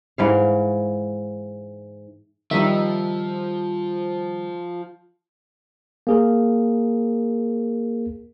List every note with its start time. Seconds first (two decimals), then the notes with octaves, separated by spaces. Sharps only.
0.18 G#2 E3 F5
2.51 D#3 F3 G3 D#4 E5
6.07 A#3 G#4 A#4